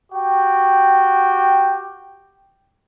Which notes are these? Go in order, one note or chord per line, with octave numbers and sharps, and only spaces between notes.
F#4 G4 G5